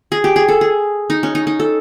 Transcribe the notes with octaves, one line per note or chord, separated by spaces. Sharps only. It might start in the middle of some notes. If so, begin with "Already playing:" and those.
G#4
G4
G#4
A4
G#4
D#4
C#4
D#4
D#4
A4